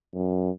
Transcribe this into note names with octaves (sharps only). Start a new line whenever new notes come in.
F#2